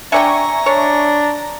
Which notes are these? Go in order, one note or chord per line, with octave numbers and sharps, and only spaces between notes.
D4 D5 E5 G5 G#5 A#5 C#6
D4 C#5